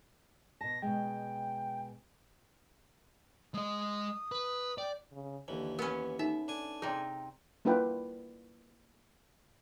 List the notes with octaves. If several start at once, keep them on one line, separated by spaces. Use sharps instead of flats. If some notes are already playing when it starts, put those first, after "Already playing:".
B2 A5 A#6
B2 G#3 G5
G#3 D#5 D#6
B4
D5 G5
C#3
D#2 D3 E3
B3 C#4 A#4 B4 B5
D#4 A4 E5
D4 A4 G#5
C3 D#4 G#4 D5
A#3 D4 E4 F4 B4 G5